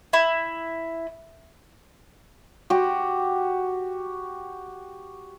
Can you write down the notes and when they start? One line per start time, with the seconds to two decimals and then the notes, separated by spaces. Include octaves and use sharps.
0.13 E4
2.70 F#4 G4